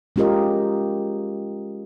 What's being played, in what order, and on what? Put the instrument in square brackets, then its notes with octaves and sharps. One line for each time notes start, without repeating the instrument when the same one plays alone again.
[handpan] G#3 C#4 F4 G4 A#4 D#5